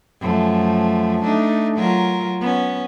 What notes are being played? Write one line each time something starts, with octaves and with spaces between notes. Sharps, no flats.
F#2 F3 A3
A3 D4 D#4
F#3 F4 A#4
B3 C#4